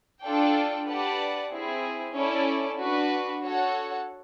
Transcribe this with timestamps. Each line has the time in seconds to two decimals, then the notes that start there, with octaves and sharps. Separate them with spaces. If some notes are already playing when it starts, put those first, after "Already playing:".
0.23 D4 F4 A4 D5 G5
0.87 G4 B4 D5 F#5 A5
1.51 C4 E4 G#4
2.16 C#4 E4 A4 D5
2.79 D4 F#4 B4
3.43 F#4 A4 C#5 F#5